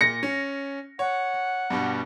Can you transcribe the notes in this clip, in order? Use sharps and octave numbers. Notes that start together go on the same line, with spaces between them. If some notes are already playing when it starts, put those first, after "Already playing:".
A#2 A#6 C#7
C#4
C#5 F#5
G2 B2 G3